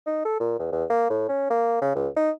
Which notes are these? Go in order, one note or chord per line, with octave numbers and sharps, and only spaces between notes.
D#4
A4
A#2
E2
E2
A#3
A2
C#4
A#3
C#3
C#2
D#4